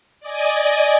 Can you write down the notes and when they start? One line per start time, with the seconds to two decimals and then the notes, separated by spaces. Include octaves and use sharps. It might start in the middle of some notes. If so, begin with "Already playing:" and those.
0.20 D5 D#5 G#5